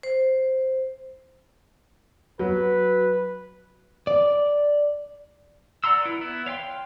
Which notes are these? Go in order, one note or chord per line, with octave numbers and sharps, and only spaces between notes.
C5
F#3 B4
D5
D5 F#5 A#5 C6 E6
E4 B4
B3 E4
C#5 F5 G5 C6